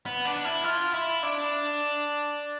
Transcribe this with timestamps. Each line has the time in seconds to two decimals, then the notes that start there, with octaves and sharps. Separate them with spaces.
0.06 B3
0.25 D4
0.45 E4
0.64 F4
0.94 E4
1.23 D4